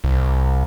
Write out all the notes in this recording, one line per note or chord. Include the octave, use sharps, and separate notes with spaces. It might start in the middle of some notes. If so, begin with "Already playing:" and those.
C2